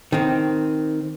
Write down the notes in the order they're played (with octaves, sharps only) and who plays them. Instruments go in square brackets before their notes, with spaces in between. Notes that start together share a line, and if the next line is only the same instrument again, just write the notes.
[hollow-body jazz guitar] D#3 C4